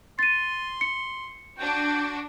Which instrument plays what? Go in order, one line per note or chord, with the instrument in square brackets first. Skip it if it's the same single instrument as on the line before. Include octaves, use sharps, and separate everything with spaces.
[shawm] C6 [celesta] A6 D#7
[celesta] C#7
[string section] D4 F#4 [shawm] G5